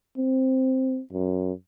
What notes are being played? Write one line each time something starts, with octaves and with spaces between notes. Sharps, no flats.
C4
F#2